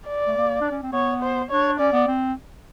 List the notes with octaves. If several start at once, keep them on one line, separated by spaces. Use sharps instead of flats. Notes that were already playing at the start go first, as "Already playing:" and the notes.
D5
A3
A#3
D4
C#4
C4
B3 C#5
C5
D4 C#5
C#4 D5
B3
C4